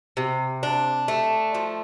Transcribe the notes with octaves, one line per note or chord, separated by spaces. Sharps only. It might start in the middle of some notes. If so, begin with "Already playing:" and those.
C3
D4
A3
F3